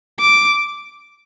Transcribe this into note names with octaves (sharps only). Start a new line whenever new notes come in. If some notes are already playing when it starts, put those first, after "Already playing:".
D6